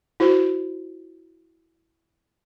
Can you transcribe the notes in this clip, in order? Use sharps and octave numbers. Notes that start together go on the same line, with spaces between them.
E4 F#4 C5